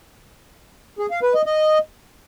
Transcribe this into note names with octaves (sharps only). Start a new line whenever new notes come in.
G#4
F5
B4
D#5
D#5